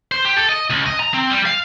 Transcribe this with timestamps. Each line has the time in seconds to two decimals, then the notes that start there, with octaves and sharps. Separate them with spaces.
0.12 C5
0.25 G4
0.37 A4
0.49 D#5
0.70 C#2
0.86 D#5
1.00 A#5
1.14 C4
1.30 G3
1.46 F5